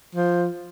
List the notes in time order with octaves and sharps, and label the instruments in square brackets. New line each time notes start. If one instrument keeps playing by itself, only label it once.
[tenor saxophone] F3